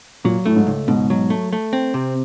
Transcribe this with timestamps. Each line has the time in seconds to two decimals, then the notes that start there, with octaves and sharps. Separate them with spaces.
0.24 A#2 F#3
0.46 A2 A3
0.56 G#2
0.67 C#2
0.88 G#2 B2
1.10 F#3
1.30 A3
1.53 A3
1.73 C4
1.94 C3